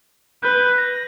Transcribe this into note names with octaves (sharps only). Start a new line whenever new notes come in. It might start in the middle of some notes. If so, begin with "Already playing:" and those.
B4 G6
A#6